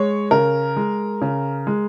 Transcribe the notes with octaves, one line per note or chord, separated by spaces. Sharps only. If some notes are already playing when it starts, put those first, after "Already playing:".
Already playing: G#3 C#5
C#3 A#4
G#3
C#3
G#3